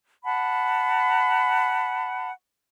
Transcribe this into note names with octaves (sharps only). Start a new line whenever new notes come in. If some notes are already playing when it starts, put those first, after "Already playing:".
F#5 A5 B5